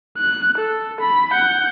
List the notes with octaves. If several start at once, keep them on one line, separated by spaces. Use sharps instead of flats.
F#6
A4
B5
F#5 G6